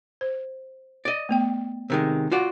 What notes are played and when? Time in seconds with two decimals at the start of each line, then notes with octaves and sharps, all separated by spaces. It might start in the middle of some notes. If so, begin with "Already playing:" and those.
0.21 C5
1.05 D5 D#5
1.29 A3 B3 G5
1.90 C3 D#3 G#3
2.32 F4 F#4 D5